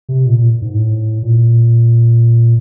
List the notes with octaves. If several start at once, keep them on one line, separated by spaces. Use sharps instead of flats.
C3
A#2
A#2
G#2
A2
A#2